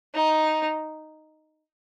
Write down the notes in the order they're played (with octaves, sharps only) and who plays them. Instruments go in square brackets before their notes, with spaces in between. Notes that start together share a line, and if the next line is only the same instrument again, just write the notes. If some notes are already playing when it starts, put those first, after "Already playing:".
[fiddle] D#4